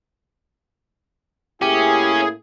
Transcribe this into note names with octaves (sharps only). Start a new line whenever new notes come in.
A2 A#3 C#4 E4 G4 G#4